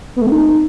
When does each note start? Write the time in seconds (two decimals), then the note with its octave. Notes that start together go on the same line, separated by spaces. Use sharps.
0.16 B3
0.21 A3
0.27 C4
0.32 D#4